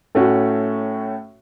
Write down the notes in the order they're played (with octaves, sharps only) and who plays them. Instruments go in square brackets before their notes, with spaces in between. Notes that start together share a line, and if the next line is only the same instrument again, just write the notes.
[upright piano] A2 A3 C#4 F#4